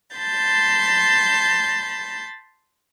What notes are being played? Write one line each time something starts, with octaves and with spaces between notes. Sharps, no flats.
A5 B5 C6 G6 A6